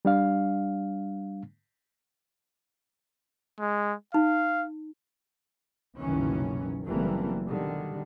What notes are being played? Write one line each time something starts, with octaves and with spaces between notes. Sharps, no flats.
G3 D4 F5
G#3
D#4 F5
F#1 C2 B2 D#3 E3 C#4
F#1 E3 G3 A3 A#3 C4
B2 D3 D#3 G3